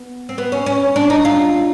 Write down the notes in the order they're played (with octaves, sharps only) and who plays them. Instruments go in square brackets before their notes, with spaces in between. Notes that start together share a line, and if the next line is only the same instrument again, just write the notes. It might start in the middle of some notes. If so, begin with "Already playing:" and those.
Already playing: [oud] B3
C4
B3
C#4
C#4
D4
D#4
F4